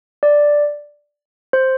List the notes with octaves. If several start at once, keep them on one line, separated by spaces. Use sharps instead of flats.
D5
C5